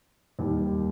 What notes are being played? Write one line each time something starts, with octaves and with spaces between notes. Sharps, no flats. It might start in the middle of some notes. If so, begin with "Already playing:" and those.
D#2 D#3 G3